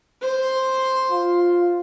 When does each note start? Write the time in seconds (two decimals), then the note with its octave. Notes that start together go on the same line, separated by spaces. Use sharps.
0.22 C5 C6
1.11 F4